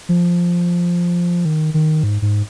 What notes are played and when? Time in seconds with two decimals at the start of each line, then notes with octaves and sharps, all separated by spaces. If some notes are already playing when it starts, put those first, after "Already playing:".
0.09 F3
1.45 D#3
1.74 D#3
2.03 G#2
2.22 G#2